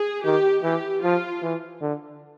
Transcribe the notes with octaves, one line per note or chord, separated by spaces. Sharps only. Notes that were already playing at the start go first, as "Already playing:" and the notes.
Already playing: G#4
D#3 G4
E3 G4
F3 F4
E3
D3